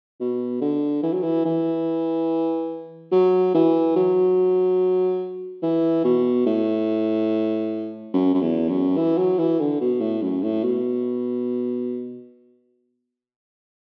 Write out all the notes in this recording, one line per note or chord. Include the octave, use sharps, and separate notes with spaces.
B2
D3
E3
F#3
E3
E3
F#3
E3
F#3
E3
B2
A2
F#2
F#2
E2
F#2
E3
F#3
E3
D3
B2
A2
F#2
A2
B2